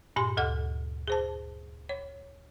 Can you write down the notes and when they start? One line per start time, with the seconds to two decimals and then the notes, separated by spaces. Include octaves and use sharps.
0.16 G2 A#2 G4 G#5 C6
0.37 D2 A4 F#5 F6
1.08 G#4 C5 A5
1.89 C#5